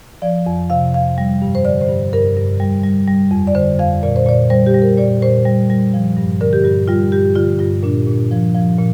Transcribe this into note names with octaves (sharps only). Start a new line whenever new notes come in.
F3 D5
F2
C3 F5
F2 F5
G3
G2
C5
D3 D5
C5
G2
G2 A#4
G2
G3
G3
G3
F2
D5
D3 C5
F2 F5
A#2 D5
C5
A#2 D5
G3 C5
G4
G3
A#4
A#2 D5
A#2 C5
G3
G3
F3
G2
D3 A#4
G4
G2 G4
G3 F4
G2 G4
D3 F4
G2 F4
A#2 D4
A#2
F3
F3
A#2